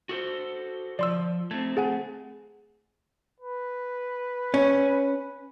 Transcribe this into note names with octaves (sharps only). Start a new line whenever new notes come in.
F#4 A4 C5
F3 D5 C6 E6
A3 C4 G#6
G#4 F#5 G#5
B4
C#4